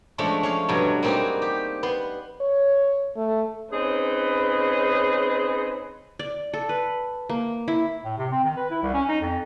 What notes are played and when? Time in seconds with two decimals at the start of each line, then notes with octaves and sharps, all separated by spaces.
0.18 F3 G#3 A3 C#4 D4
0.43 C#4 C#5 F5
0.69 G2 B2 F#3
1.03 G3 A#3 C4 D#4 F#4 G#4
1.42 G4
1.83 B3 C6
2.41 C#5
3.17 A3
3.72 C4 C#4 D#4 G#4 B4
6.19 D5
6.53 A4
6.69 B4
7.29 A#3
7.68 E4
8.05 A2
8.18 C3
8.32 C4
8.44 D#3
8.57 B4
8.71 E4
8.83 C2
8.94 C#4
9.09 D#4
9.21 F2